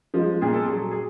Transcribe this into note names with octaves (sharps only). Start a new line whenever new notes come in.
F3 G#3
A#2 G#4
A4
F#3 G#4
G#4